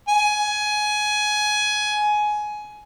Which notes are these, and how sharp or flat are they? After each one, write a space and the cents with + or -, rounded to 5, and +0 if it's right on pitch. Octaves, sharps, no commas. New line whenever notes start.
G#5 +15